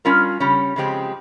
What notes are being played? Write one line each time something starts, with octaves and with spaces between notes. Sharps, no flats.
G3 C#4 F4 A#4
C#3 G3 C#4
C#3 F3 G#3 C4 G4